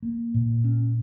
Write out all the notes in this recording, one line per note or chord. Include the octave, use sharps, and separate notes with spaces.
A#3
A#2
C#4